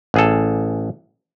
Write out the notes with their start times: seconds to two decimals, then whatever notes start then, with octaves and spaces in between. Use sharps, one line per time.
0.14 A1 G#4 A4